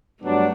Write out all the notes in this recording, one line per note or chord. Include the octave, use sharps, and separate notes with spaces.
G2 F#3 A3 B3 D4